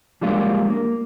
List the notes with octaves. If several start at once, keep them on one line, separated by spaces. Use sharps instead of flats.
F3 G3 G#3 A#3 D4 F4
A#3